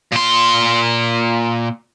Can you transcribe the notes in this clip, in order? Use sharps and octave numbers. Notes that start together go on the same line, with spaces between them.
A#2 C6